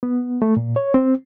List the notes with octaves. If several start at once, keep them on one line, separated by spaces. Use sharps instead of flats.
B3
A3
A#2
C#5
C4